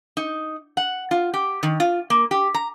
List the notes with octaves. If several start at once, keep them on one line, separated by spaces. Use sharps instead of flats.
D#4
F#5
F4
G4
D#3
F4
A#3
G4
A#5